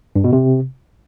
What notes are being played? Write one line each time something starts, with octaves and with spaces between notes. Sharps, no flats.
G2
B2
C3